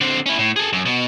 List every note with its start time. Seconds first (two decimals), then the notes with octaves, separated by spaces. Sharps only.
0.01 D3 C4
0.26 C#4 E4
0.39 A2
0.56 G#4 A4
0.73 F#2
0.86 B2